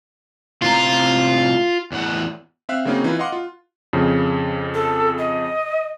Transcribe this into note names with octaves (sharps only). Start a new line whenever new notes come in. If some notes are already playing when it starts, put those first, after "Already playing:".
A2 C3 F4 A#5
E2 A2 F#5
C4 E5 F5 F#6
C#3 F#3 A#3 C4 C#4 D#4
E3 D#4 F4 B4
D#5 F5 F#5 C6 D6
F4
F2 C#3
A4
D#5